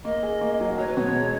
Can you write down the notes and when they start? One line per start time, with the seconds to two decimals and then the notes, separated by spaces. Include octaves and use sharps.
0.05 A#3 D#5
0.23 G#4
0.41 A#3
0.60 F#3
0.78 F#3 C#5
0.87 B4
0.96 B2 C#5
1.14 G#3